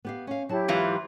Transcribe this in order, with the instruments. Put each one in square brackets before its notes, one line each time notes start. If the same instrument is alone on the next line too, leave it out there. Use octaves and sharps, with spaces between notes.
[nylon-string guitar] B3 G4 F5
C#4 F5
[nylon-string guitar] F#3 A5 [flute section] E4 G4
[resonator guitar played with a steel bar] G#2 E3 F4